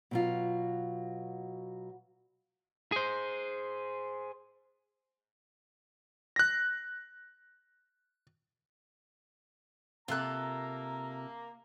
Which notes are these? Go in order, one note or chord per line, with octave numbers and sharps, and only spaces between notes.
B2 F#3 F4
G#4 C5
F#6 A#6
C3 A#3 F4 A4 A#5 F#6